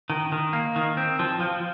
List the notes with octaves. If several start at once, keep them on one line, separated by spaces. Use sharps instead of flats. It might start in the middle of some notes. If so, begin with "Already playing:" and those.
D#3
D#3
A#3
D#3
C4
F3
F3